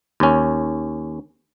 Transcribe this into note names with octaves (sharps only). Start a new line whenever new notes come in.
D#2 C#4